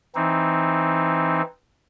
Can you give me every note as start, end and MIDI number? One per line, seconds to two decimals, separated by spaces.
0.15 1.42 52
0.15 1.42 60
0.15 1.42 63